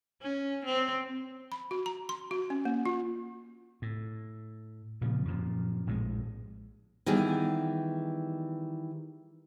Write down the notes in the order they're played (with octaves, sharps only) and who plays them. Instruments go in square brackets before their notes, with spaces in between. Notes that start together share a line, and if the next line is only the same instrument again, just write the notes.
[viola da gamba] C#4
C4
[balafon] B5
F#4
A#5
C6
F#4
C#4
A#3
F4
[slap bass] A2
A#2 C#3 F3
F#2 A#2 F3
A#1 A2 E3 G#3
[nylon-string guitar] D#3 E3 G3 B3 G#4